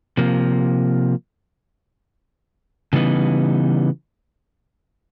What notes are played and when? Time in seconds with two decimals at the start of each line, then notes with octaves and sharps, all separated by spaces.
0.17 C3 F3 A#3
2.93 C#3 E3 G3 B3 D#4